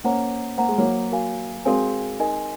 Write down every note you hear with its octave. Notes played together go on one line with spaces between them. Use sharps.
A#3 C#4 C5 F#5 A#5
A#3 C5 F#5 A#5
G#3
F#3 A#3
F#4 A#4 F5 G#5
G#3 C4 F#4 A#4 F5 G#5
D#4 A#4 D#5 G#5